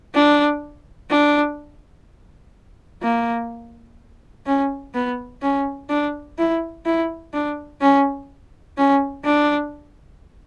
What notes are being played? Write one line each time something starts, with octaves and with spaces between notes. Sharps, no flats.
D4
D4
A#3
C#4
B3
C#4
D4
E4
E4
D4
C#4
C#4
D4